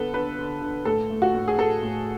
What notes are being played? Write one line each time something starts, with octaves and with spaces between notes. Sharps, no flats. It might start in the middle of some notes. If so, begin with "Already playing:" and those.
Already playing: D3 B3 A4 B4
D3 B4
D3
D3
A2 A4
A3
F#4
A2
G#4
A2 A4
A2